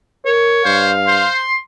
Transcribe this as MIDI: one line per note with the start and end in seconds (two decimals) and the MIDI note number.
0.25 0.65 70
0.25 0.89 73
0.65 1.26 43
0.65 0.92 72
0.65 1.30 77
1.07 1.43 72
1.07 1.55 84